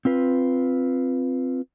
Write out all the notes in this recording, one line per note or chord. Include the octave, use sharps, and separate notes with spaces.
C4 F4 B4